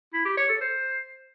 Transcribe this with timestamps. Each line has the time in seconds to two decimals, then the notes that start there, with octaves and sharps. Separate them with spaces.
0.13 E4
0.25 G4
0.37 C#5
0.49 A4
0.61 C5